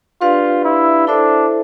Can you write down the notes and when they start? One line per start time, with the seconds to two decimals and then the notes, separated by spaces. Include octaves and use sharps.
0.21 D4 F4 G4 B4 D5 F5
0.65 E4
1.07 D4 E4 A4 C5 E5